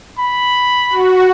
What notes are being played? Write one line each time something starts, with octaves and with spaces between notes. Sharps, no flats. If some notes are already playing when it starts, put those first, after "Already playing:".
B5
F#4